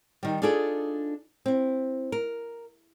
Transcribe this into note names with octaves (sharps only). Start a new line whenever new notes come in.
D#3 G3
D4 D#4 F4 G#4 A4 D5
C4 E4
A#4